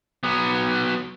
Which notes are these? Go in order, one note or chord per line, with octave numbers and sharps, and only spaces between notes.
F#3 B3